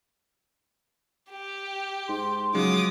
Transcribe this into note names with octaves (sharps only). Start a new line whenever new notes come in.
G4
G#2 C6
C#3 F3 F#3 G#3 D6 D#6